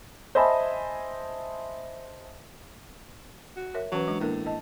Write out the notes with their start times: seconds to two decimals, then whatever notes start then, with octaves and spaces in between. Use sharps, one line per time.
0.35 C5 D#5 E5 G#5 A5 B5
3.56 F#4
3.74 A#4 C#5 E5
3.92 E3 F#3 C#4 B4
4.08 G#3 D4
4.20 A2 A#3 D4 A#4
4.46 D#5 A5